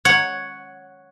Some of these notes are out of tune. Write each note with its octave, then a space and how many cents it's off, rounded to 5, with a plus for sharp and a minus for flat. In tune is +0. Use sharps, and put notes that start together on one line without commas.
C#5 +0 F#5 +0